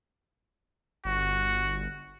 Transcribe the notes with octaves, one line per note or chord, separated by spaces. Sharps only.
G1 F#4